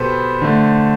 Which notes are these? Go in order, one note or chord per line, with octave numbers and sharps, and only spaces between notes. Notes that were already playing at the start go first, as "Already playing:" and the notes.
Already playing: B2 B3 G4 A4 B4 C5
D3 A3